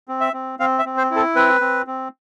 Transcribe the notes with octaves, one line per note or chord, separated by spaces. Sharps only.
C4
E5
C4
C4 F5
E5
C4
C5
E4
A4
C4 B4
C4
C4